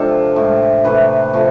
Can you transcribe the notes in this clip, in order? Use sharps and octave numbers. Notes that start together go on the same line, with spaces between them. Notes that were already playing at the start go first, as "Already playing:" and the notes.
Already playing: C3 F3 G#3 C4 D4 F4 A4
A2 G#3
C3 E3 A3 B4
C3 F3 A3